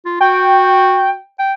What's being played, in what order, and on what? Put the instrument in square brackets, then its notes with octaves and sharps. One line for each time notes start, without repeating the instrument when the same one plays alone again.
[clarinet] F4
[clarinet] F#4 [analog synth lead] G5
[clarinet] G5